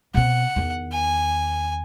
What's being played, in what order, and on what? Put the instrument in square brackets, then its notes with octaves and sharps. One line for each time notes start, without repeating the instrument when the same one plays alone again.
[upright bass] B2 C4 [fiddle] F#5
[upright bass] E2 D#3
[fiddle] G#5